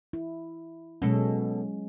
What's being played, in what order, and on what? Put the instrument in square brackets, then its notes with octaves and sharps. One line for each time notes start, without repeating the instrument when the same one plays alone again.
[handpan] E4
[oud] B2 A4 [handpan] F#3 G#3 C#4